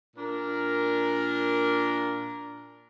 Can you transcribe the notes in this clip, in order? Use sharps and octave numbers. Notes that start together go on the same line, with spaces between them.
A#2 D4 A#4